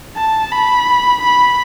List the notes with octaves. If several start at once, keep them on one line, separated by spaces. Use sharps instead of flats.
A5
B5
B5